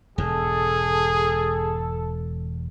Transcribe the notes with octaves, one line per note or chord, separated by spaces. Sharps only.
E1 G#2 G#4 A4